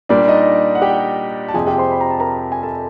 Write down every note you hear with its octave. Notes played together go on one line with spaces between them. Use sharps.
A#2 G3 D4 D5
D#4 D#5
F#5
G4 G5
A5
F2 C3 F3 G#4 G#5
G4 G5
C5 C6
B5
A#5
A5
A#4 A#5
G#5
A4 A5